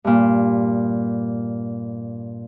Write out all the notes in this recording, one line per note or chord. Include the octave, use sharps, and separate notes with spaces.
G2 A#2